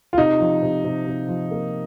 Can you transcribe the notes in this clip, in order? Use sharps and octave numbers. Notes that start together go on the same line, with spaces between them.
F4
C3 D#4
F3
C3
C3
C3
F3
A#3